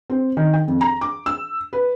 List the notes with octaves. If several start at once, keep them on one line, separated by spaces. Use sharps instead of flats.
C4
D#3
G5
F2
A#5
D6
E6
B4